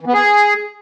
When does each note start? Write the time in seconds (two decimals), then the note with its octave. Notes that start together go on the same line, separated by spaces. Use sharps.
0.01 E3
0.07 B3
0.13 G#4